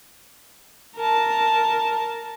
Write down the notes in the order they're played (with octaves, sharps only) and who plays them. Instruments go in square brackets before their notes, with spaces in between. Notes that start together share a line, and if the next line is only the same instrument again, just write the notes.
[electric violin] A#4 A5